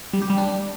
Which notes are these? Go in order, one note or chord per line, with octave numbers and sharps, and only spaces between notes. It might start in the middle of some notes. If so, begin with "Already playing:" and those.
G3
G4
G3
D4